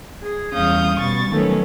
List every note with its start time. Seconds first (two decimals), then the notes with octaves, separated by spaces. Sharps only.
0.21 G#4
0.53 E2 G3 C#4 F5 D#6 G6
0.97 B2 G3 C#6 A6
1.30 D#3 F#3 A3 B3 C#4